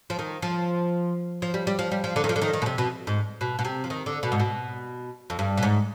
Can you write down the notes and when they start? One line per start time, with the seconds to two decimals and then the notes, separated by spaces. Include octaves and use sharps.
0.10 F3
0.19 D#3
0.42 F3
1.42 F3
1.54 G3
1.67 G3
1.79 F3
1.92 G3
2.04 F3
2.16 D3
2.24 D#3
2.29 F3
2.36 D3
2.42 D#3
2.54 D#3
2.62 B2
2.66 C3
2.78 B2
3.07 G#2
3.41 B2
3.59 B2
3.65 C3
3.84 F3
3.90 D#3
4.06 D3
4.23 B2
4.32 G#2
4.40 B2
5.30 F2
5.39 G2
5.58 B2
5.63 G#2